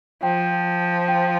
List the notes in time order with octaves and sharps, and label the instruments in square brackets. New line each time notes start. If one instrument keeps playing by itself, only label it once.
[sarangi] F3 [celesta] G5
[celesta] G5